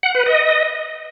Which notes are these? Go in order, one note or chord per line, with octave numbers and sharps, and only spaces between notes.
F#5
B4
D#5